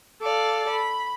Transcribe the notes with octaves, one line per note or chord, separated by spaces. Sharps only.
A4 D5 F5
B5